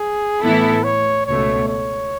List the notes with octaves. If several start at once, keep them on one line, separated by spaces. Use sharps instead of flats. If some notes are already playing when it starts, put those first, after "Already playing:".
Already playing: G#4
A2 E3 B3 E4 A4
C#5
C#2 B2 A3 C#5
C#5